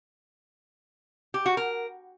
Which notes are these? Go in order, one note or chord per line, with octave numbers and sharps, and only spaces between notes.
G4
F#4
A#4